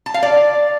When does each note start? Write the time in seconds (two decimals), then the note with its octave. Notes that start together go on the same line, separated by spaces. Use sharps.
0.06 A5
0.14 F5
0.23 D5